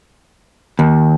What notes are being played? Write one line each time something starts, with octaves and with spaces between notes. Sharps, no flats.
D#2